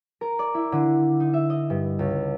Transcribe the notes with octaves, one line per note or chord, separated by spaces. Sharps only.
A#4
D5
E4
D3
D#4
E5
D#5
G2
C#2